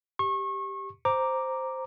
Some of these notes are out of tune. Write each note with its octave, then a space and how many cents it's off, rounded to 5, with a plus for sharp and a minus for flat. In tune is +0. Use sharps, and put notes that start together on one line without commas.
G4 +0 C#6 -30
C5 +0 A#5 +0 D6 +0